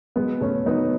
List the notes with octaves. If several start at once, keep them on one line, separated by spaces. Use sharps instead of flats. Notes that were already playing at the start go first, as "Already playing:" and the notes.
F#3 G#3 B3
B2 A3 C#4
F#3 B3 D#4